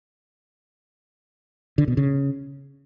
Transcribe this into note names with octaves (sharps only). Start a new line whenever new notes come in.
D3
B2
C#3